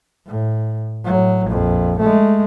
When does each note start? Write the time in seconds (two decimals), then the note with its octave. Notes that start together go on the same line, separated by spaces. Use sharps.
0.27 A2
1.05 A2 F#3
1.46 A#1 F2
2.00 G#3 A3